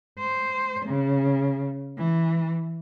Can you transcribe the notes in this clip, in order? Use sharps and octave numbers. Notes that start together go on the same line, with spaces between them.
C5
C#3
E3